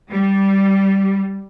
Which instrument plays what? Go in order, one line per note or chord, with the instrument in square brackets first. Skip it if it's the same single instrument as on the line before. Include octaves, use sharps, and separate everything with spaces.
[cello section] G3